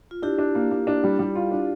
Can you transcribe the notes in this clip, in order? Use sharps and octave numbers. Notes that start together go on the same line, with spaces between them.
F4
D4 E4 G4
D4
A#3
A#3
D4
G3
G3
F4
D4